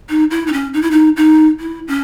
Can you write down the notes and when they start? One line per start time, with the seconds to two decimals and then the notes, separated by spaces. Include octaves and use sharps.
0.09 D#4
0.31 E4
0.47 D#4
0.53 C#4
0.74 D#4
0.82 E4
0.91 D#4
1.17 D#4
1.60 E4
1.88 C#4